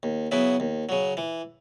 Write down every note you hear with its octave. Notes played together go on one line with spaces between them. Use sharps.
D#2
C#3 F#3 B3 E4
D#2
C#3 F#3
E3